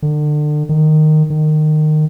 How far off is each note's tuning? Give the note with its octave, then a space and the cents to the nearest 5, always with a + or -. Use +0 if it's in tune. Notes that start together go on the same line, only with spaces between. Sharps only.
D3 +35
D#3 -10
D#3 -20